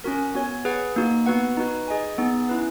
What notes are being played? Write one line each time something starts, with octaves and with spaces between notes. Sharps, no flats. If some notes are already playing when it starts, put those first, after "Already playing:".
C#4 F#4 A#4
B3 F#4 C#5 G#5
G#4 B4 F#5
A#3 D#4 F#4
B3 F#4 B4 F#5
D#4 F#4 B4
G#4 D#5 G#5
B3 D#4 G#4
C#4 E4 B4